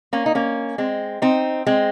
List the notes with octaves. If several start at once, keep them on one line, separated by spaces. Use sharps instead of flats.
A#3 C#4
D#4
A#3 C#4
G#3 C4
C4 D#4
G#3 C4